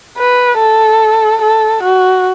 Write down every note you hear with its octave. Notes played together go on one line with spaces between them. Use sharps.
B4
A4
A4
F#4